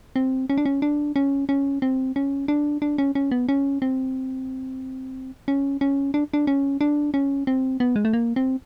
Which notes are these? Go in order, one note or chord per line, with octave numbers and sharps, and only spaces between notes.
C4
C#4
D4
C#4
D4
C#4
C#4
C4
C#4
D4
D4
C#4
C#4
B3
C#4
C4
C#4
C#4
D4
D4
C#4
D4
C#4
C4
B3
G#3
A3
A#3
C4